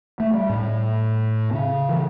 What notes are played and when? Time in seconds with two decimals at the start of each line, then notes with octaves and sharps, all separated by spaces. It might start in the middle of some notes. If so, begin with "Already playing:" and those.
0.20 A3
0.34 G3
0.49 A2
1.53 C#3
1.89 E3